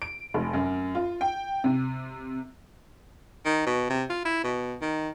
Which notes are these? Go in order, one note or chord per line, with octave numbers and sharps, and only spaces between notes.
D7
F1
F#2
F4
G5
C3
D#3
B2
C3
F4
E4
B2
D#3